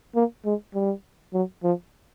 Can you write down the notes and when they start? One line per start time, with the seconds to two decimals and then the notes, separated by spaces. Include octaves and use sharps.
0.15 A#3
0.45 G#3
0.74 G3
1.34 F#3
1.63 F3